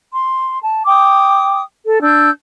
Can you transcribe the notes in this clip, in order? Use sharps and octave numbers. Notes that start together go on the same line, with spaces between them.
C6
A5
G5 D6 D#6
A4
D4 E6 G6